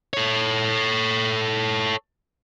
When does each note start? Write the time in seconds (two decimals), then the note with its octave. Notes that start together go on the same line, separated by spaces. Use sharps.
0.13 A4 C#5